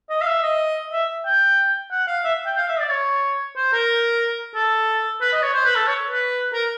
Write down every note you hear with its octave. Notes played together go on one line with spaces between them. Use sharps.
D#5
F5
E5
D#5
E5
G5
F#5
F5
E5
G5
F5
E5
D5
C#5
C5
A#4
A4
B4
D#5
C#5
C5
B4
A4
C#5
B4
A#4